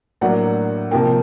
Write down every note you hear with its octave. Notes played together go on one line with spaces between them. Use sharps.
A2 F#3 A#3 D4 F#5
C3 F3 A#3 G5